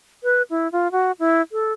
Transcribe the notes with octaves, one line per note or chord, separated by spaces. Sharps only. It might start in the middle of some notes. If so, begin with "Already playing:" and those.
B4
E4
F4
F#4
E4
A4